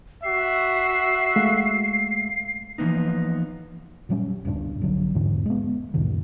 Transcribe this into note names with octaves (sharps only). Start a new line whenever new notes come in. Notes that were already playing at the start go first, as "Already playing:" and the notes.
F#4 E5 C7
G#3 A3 F5
E3 F3 A#3 B3 D#4
A#2 F#3 G3 C#4
D1 B1 G2 D4
A#1 D3 F#3
E2 G#2 B2 D3
G#3 B3
C#2 F#2 A#2 D#3